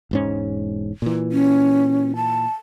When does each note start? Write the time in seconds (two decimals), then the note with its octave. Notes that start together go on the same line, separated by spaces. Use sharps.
0.11 E1 G#2 C#4
1.02 A#2 E3
1.32 C#4
2.16 A5